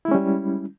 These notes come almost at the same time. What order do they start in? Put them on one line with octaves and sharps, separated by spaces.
E4 G#3 C#4 G3